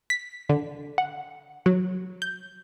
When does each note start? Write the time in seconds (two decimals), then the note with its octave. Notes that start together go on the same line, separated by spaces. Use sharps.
0.10 B6
0.49 D3
0.98 F#5
1.66 F#3
2.22 G6